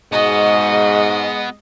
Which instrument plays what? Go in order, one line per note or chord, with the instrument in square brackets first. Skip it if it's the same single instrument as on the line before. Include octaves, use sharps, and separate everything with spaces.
[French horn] G#2 [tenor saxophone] G#3 [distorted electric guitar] B3 F#4 [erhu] D#5